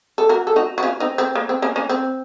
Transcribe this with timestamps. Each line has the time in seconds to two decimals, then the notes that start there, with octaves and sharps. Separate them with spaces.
0.18 A4
0.29 F#4 A#4
0.47 A4
0.56 D#4 F#4
0.78 F#4
0.83 C#4 F4
1.00 C4 D#4
1.18 C4
1.35 A#3
1.49 C4
1.62 A#3 C#4
1.76 A#3 C#4
1.89 C4